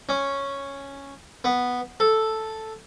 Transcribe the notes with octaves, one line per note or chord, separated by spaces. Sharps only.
C#4
B3
A4